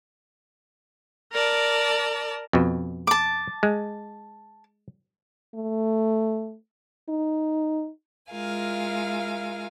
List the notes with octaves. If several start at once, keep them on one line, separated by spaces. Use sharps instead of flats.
A#4 D5 A5
F2 B2
A5 D6
G#3
A3
D#4
G#3 E4 F4 A#4 F5 G#5